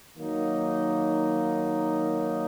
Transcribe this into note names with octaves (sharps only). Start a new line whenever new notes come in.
D#3 F#3 A#3 D#4